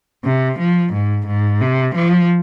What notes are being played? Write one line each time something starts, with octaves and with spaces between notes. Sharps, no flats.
C3
F3
G#2
G#2
C3
F3